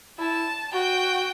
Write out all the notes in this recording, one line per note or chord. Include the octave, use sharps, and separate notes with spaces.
E4 A5
F#4 G5